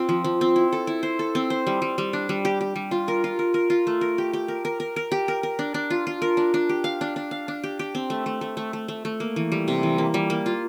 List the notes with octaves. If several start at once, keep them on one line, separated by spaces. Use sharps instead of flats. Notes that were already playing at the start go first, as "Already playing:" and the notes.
Already playing: C4 F4
F3
F3
C4
E4
A4
E4
C5
A4
C4
C5
G3
G3
G3
D4
G3
G4
G4
G3
F4
A#4
F4
A#4
A#4
F4
A3
A#4
G4
G4
A#4
A#4
A#4
A#4
G4
A#4
A#4
D4
D4
F4
F4
A#4
D4
D4
G4
F5
D4
D4
F5
D4
G4
G4
C4
A3
A3
A3
A3
A3
A3
A3
A#3
E3
G3
C3
E3
A#3
G3
A#3
F4